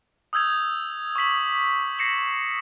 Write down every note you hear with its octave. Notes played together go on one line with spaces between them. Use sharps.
D#6 E6 G6 G#6 F7
C#6 D6 B6 F#7
A#6 C7 C#7 E7 F#7